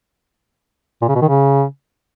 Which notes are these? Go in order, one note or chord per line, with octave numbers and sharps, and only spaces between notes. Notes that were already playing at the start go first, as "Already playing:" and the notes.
A#2
C#3
B2
D#3
C#3